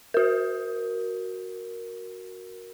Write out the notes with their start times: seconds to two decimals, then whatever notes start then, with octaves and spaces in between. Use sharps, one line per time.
0.14 F#4 A#4